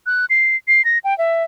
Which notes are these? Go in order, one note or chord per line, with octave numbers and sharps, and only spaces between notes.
F#6
C7
C7
A#6
G5
E5